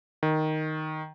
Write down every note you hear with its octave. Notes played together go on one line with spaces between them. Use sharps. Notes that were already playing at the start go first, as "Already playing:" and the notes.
D#3